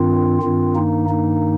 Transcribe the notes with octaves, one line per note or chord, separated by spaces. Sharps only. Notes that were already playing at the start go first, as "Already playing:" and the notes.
Already playing: G2 D#3 C4 F4
G2 D#3 C4 F4
A#3 D#4
A#3 D#4